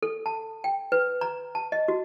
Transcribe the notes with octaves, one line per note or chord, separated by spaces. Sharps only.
A4
A5
G5
B4
A#5
A5
D#5
F#4